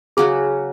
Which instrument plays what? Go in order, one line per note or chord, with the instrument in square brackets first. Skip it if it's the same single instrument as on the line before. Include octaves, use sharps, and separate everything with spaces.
[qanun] C#3 F#3 C#4 F#4 [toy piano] G#4